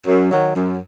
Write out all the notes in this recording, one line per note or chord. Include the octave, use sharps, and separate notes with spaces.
F#2
D#3 F#3
F#2